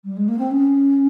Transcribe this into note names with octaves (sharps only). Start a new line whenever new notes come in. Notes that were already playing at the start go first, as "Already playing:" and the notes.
G3
G#3
A#3
C4
C#4